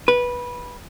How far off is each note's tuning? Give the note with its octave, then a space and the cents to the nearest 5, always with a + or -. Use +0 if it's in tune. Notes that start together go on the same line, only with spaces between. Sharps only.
B4 -15